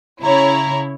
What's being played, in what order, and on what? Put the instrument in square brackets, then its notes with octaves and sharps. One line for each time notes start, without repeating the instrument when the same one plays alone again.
[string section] C#3 E4 C#5 [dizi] A#5